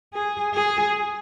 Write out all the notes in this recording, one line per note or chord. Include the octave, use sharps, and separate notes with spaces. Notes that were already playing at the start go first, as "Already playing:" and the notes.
G#4
G#4